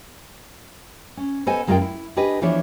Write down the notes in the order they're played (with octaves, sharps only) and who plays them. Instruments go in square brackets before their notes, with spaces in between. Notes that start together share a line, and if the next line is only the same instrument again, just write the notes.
[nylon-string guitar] C#4
B3 A4 C5 D#5 G#5
F#2 G#3 A#3 F4 A#4 G5
E4
D4 G4 G#4 B4 D#5
E3 F3 B3 D4 G#4 C#5